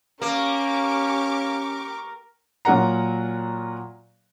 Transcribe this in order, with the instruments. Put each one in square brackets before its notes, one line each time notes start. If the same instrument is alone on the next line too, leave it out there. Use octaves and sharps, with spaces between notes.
[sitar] A#3 [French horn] C#4 [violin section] G4 C#6 D6 [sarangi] A#4
[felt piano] A#2 F#3 A#4 F#5 A#5